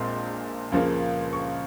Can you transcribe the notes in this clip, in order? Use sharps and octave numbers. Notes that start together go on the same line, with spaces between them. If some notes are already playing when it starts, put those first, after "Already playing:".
Already playing: A#1 A#2 G#3 C4 C6
C#2 C#3 F3 A#3
C#6